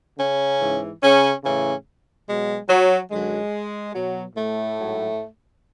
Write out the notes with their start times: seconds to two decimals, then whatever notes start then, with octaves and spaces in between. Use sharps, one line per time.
0.18 C#3 C#4
0.61 G#2 E3
1.02 C#3 C#4
1.44 A2 C#3 E3 C#4
2.27 B2 F#3 G#3
2.69 F#3
3.11 F#2 D3 F#3 G#3
3.94 B2 F#3
4.36 A2 A3
4.78 G#2 F#3